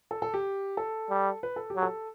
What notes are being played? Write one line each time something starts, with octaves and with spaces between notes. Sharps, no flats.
A4
A4
G4
A4
G3
B4
A4
G4
F#3
A4